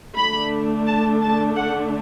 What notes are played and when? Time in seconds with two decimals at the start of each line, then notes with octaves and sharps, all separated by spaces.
0.16 D3 A3 D4 B5
0.86 A5
1.21 A5
1.56 F#5